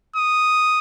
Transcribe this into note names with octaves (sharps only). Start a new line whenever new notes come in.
D#6